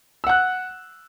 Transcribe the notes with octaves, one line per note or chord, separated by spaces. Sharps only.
F#5 E6 F#6